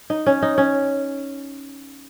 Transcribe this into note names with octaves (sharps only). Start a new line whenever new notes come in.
D#4
C#4
D#4
C#4